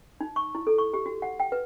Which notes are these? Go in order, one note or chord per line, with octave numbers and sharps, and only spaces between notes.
D#4
C#6
E4
A4
C#6
G4
F#4
F#5
G5
B4